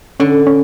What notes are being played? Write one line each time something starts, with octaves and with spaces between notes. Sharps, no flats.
D3 C#4
C#4